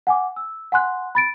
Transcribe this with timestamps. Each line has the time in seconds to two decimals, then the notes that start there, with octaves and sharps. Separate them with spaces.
0.07 F#5 G#5 D6
0.36 E6
0.72 F#5 G#5 C6 F#6
1.15 B5 A6 D7